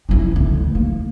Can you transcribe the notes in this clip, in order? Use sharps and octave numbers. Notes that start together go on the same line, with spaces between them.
C#4 E4
D2
A#3